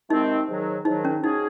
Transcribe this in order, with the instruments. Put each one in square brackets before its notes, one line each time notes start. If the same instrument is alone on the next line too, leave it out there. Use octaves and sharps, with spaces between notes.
[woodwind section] C3 D#3 G#3 C4 [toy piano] D#4
[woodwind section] G#2 D#3 F#3
[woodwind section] G#2 D#3 F#3 [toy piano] D#4
[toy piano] C#4
[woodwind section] G#2 F#3 C#4 G#4 [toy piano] D#4